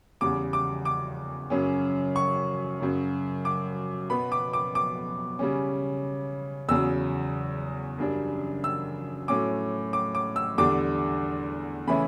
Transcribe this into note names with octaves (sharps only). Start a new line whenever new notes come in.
E2 C#3 G3 D6
D6
D6
F#2 C#3 F#3 C#4
C#6
F#2 C#3 F#3
D6
B2 F#3 B3 B5
D6
D6
D6
C#3 G3 C#4
E2 C#3 F#3 E6
F#2 C#3 G3 D4
E6
A2 F#3 C#4 D6
D6
D6
E6
E2 D3 G3 D4 D6
C#3 E3 A3 C#4 E4 B5